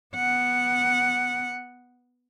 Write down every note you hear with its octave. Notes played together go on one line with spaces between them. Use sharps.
B3 F#5